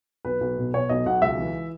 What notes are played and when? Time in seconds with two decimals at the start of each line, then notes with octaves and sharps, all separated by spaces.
0.25 B1 B4
0.41 B1
0.58 B2
0.74 B2 C#5
0.89 B1 D#5
1.06 B1 F#5
1.22 C#2 E5
1.38 E3